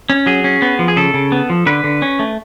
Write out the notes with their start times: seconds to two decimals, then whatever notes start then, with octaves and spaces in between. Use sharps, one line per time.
0.10 C#4
0.26 F#3 G#4
0.44 C#4
0.62 B3
0.79 F3
0.88 G#4
0.96 C#3 A4
1.14 C#3
1.32 B3
1.50 F3
1.66 D3 B4
1.84 D3
2.02 C#4
2.19 A3